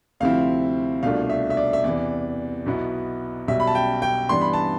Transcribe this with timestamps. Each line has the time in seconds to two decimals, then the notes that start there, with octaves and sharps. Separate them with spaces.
0.20 D2 C3 F3 C4 E4 F5
1.03 C2 B2 A3 D4 F4 F5
1.30 E5
1.50 E5
1.57 D5
1.73 E5
1.84 E2 C3 E3 D5
2.66 B1 B2 B3 E4
3.48 B1 B2 G3 E5
3.60 B5
3.67 A5
3.75 G5
4.02 G5
4.29 G2 E3 G3 B3 D4 C6
4.41 B5
4.53 A5